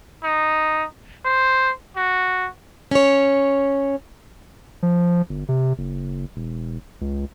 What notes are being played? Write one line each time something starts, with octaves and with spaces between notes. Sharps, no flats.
D#4
C5
F#4
C#4 C#5
F3
G1
C3
F#1
E1
C#2